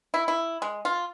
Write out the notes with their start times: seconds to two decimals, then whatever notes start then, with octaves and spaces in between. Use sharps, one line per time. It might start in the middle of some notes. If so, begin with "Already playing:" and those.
0.14 E4
0.28 E4
0.62 G#3
0.85 F4